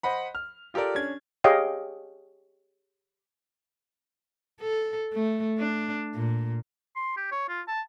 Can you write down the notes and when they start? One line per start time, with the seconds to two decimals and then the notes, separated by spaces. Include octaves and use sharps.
0.03 C5 D#5 F#5 B5
0.35 F6
0.74 F4 G4 A4 A#4 D5
0.95 C#4 D4 G#6
1.44 G4 G#4 C#5 D#5 F5 G5
4.61 A4
5.13 A3
5.58 D4
6.15 A#2
6.96 C6
7.17 G4
7.32 C#5
7.49 F4
7.67 A5